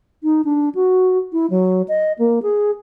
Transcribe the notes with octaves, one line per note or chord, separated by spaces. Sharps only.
D#4
D4
F#4
E4
F#3
D#5
A#3
G#4